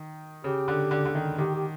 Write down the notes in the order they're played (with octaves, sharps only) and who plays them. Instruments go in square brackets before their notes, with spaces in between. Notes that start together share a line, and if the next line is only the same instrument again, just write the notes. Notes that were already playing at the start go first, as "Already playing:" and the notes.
Already playing: [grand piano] D#3
[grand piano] C#3 [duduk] G4
[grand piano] D3
D3
D3
D#3
[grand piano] D#3 [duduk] G4
[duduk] G4